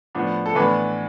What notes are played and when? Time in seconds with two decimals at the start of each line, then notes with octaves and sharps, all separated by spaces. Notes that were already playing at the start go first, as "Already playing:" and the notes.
0.15 A2 F3 B3 D4
0.46 A4
0.55 A2 E3 B3 D4 B4